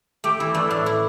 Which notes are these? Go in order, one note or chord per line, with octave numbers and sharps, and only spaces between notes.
A3 G4
E3 E4
A3 D4
E4
A2 D4
E4